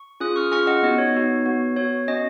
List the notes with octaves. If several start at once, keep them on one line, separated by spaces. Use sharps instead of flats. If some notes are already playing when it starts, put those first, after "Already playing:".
Already playing: C#6
C#4 F4 G#4 D#6 F#6
C#6 F6
C#4 F4 G#4 C#6 F6
D#5 F#5
B3 D#4 F#4 D#5
C#5
B3 D#4 F#4
B3 F#4
B3 F#4 C#5
C#4 F#4 D#5